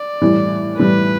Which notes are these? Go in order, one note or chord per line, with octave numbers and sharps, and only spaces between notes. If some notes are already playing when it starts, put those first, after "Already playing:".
Already playing: D5
A2 E3 G3
A2 E3 G3 B4